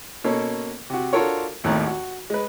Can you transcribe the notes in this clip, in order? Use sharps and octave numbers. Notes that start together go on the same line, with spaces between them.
B2 A#3 C#4 A4
C3 F#4
D4 F4 F#4 A4 A#4 C#5
G#1 D#2 A2 D#3 A#5 F#6
F#4
G#3 B4